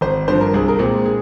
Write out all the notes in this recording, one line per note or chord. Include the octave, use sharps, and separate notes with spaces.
G#1 C5
G2 D3 F3 C5
A#4
C2 G#4
A#4
A#2 G#3 C4
G#4